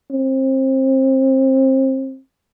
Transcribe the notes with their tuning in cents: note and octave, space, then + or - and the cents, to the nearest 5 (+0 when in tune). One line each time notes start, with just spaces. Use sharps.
C4 +25